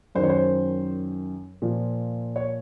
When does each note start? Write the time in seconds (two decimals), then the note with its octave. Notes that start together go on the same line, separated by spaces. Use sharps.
0.15 F#2 D#3 C5
0.23 C#5
0.30 C5
1.62 A#2 F3
2.36 C#5